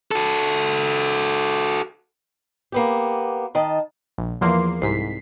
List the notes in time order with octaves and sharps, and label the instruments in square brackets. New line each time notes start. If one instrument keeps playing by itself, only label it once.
[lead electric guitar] F#4 A4
[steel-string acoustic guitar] A#3 B3 G4
D#3 D#5 A5
[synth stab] A#1
[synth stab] E2 A#3 C7 [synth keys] F3 C6 D6
[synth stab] C2 G#2 B6 [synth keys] C7